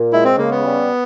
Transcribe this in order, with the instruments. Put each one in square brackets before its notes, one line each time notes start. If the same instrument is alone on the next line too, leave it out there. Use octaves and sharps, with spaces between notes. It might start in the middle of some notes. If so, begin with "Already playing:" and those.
Already playing: [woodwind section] A#2
[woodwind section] G#3 [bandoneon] E4
[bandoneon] C4
[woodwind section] C#3 [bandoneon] A#3
[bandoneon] B3
[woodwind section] G3